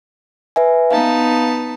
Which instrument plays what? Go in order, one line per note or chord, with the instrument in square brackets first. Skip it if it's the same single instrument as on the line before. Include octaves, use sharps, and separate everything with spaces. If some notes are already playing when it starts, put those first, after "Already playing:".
[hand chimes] B4 E5 G#5
[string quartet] B3 D#4 A5 [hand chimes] F5